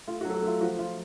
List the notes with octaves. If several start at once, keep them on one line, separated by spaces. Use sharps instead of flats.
A3 F4
F#4
F#3 A4
F#4
A3 F4
F3 F#4
F3 F4